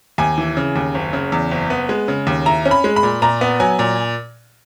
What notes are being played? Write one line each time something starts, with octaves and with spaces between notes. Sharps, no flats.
D#2 G#5
E3
C#3
D#2
F#1
C#3
E2
F#1
B3
G#3
C#3
D#2
E4 A#5
C#4
B5
G#3
B5
A#2
A#2 A#5
B3
F#3 G#5
A#2